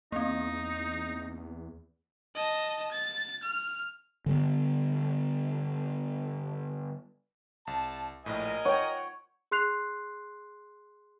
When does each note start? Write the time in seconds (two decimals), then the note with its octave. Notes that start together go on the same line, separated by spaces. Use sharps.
0.12 E2 A#3 C4 D#4
2.36 D#5 A5
2.91 A6
3.42 F6
4.26 D3 G3 B3
7.67 C2 A5
8.26 A#1 A2 A#4 D#5 G#5
8.65 C#5 F#5 G5
9.51 G#4 C6 F#6 C7 F7